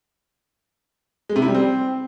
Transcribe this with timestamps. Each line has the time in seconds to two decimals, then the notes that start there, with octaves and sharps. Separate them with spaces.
1.29 G#3
1.36 C3
1.42 E4
1.48 G3
1.55 C4